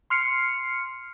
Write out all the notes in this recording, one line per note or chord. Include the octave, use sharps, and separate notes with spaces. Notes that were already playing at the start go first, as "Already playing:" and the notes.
C6 F6 C7 C#7